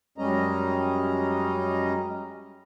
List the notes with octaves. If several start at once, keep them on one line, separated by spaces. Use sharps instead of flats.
F#2 G3 G#3 C#4 D#5 A#5